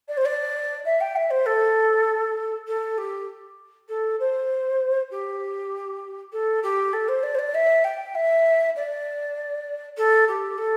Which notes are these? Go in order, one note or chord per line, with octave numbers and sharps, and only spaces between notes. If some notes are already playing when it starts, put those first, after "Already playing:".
D5
C5
D5
E5
G5
E5
C5
A4
A4
G4
A4
C5
G4
A4
G4
A4
C5
D5
C5
D5
E5
G5
E5
D5
A4
G4
A4